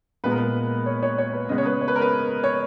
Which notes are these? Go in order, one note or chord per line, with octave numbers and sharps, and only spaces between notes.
A#2 G#3 B3 B4
A#4
B4
C#5
C#5
C#5
B4
C#3 G#3 B3 D#5
C#5
B4
C#5
B4
A#4
B4
C#5